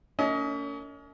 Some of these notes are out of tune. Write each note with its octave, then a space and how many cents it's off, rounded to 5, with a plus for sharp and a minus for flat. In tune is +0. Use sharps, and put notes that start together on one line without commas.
A#3 -35 C#4 +35 D#5 +30